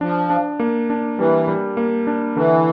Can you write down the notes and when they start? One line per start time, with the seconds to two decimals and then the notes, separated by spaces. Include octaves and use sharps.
0.01 F3 D4
0.30 D4
0.60 A#3
0.90 D4
1.18 E3 G3
1.48 G3
1.77 A#3
2.07 D4
2.35 D3 E3